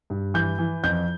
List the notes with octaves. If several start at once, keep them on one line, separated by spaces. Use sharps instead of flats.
G2
E3 G6
E3
F2 G6